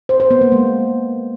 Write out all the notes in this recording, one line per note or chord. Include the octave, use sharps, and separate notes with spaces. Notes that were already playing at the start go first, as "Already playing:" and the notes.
C5
C5
B3
A#3
G#3